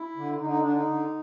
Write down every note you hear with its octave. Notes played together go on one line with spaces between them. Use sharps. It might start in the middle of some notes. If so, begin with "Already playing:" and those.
Already playing: E4
D3
D3 D#4
D#4
D3 D4
D#4
D3